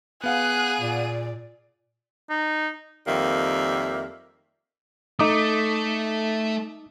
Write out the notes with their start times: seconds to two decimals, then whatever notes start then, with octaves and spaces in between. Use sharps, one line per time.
0.24 B3 G#4 F5 F#5 F#6 D#7
0.81 A#2 D5
2.30 D#4
3.07 F2 D#3 G3 A#3 E5
5.19 A3 D#4 D6 D#6